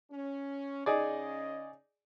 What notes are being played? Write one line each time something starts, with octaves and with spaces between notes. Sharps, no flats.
C#4
C#3 C#4 D#4 G#4 D5 D#5